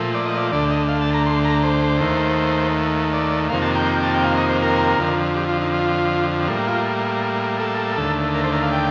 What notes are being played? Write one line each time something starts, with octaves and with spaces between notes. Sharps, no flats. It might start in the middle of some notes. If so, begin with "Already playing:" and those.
Already playing: A#2 F3 A3
D5
D#5
D5
D2 D3 A3 D5
D#5
F5
A5
A#5
C6
A#5
C5
D#2 D#3 A3
D5
F2 C3 D#3 A#3 F5
A5
G5
A5
G5
F5
D#5
C5
A#4
F2 D3 F3
G4
F4
D#4
F4
A2 G3 A#3
F4
A4
D#2 D3 A3
A#4
C5
A#4
F5
G5